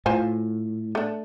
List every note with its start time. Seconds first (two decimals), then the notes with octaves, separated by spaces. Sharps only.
0.06 A2 F4 C5 G#5
0.95 A3 D4